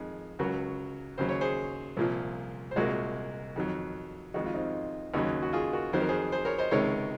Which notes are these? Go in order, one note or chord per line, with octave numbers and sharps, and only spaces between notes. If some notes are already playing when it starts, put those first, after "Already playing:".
Already playing: F2 D#3 G#3 G#4
C#2 C#3 F#3 F#4 A#4
D#2 C#3 F#3 C5
C#5
G#4 C5
C2 A#2 F3
C5
C2 A#2 G#3 F#4 A#4
F2 D#3 F#3
F2 D#3 G#3 D#4 F#4
F4
C4 D#4
D#2 C#3 F#3 D#4 F#4
F#4
F4 G#4
F#4 A#4
F2 D#3 F#3 C5
A#4
G#4 C5
G#4 C5
A#4 C#5
C5 D#5
C#2 C3 D#3 G#3 A#4 C#5